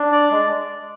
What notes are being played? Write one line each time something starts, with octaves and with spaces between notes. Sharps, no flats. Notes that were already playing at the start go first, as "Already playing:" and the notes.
Already playing: D4
D5
G#3